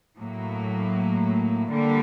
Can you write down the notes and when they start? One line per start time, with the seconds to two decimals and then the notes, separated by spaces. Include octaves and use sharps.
0.17 A2 F#3 A#3
1.71 D3 G3 A#3